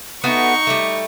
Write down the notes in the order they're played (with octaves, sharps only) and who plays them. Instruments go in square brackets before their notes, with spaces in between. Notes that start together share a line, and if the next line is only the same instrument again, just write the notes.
[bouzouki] A3 B3 F#4 [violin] D#4 C#6
[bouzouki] G3 A3